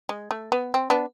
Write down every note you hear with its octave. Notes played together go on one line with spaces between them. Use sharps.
G#3
A3
B3
C4
B3 D4